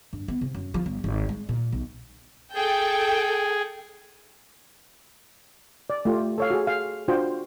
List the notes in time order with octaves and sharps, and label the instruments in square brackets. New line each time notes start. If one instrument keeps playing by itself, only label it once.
[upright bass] G2
B3
C3
F#2
F3
G1
G#1
G#3
A#2
B1
[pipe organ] G#4 [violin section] A4 G5
[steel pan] D5
A3 F4 G4
A4 C#5 F5
F#4 G#4
F5
D4 F4 F#4 C5 G5